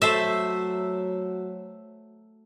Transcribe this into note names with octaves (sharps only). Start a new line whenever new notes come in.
F#3 A3 C5 E5